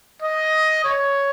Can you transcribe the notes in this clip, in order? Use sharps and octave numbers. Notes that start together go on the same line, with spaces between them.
D#5
C#5